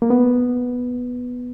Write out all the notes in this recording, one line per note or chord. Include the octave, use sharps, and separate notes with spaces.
A#3
B3